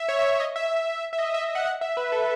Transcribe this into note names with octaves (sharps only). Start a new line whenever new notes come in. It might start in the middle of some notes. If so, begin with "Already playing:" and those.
Already playing: E5
C#5
E5
E5
D#5
E5
E5
D#5
E5
E5
E5
F#5
F#5
E5
B4
A4